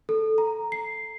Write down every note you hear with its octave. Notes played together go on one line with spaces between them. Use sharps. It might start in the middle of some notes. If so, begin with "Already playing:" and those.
A4
A#5
C7